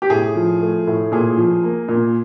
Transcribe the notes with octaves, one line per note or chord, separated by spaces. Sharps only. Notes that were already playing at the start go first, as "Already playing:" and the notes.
G4
A2 G#4
F3
A3
A2
A#2 G#4
F3
A#3
A#2